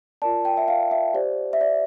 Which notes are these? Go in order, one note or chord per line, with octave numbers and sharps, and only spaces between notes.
F4 A#4 D5 A5
G5
E5
F5
E5
G4 C5 D5
E5
D5